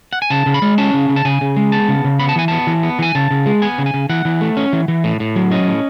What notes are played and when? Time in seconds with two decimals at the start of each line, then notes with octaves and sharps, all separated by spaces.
0.13 F#5
0.22 G#5
0.30 C#3 A5
0.46 C#3
0.54 B5
0.62 G#3
0.78 C#4 A5
0.93 C#3
1.09 C#3
1.16 A5
1.25 C#3 G#5
1.41 C#3
1.56 G#3
1.72 B3 A5
1.88 C#3
2.04 C#3
2.20 B3 B5
2.29 A5
2.36 E3 G#5
2.48 B3 A5
2.67 E3
2.83 B3
2.99 E3 G#5
3.15 C#3 A5
3.31 C#3
3.46 G#3
3.62 B3 G#5
3.78 C#3
3.86 G#5
3.94 C#3
4.09 E3 F#5
4.25 E3
4.41 A3
4.57 C#4
4.73 E3
4.88 E3
5.04 A2
5.20 A2
5.36 F#3
5.51 C#4 D#5
5.67 A2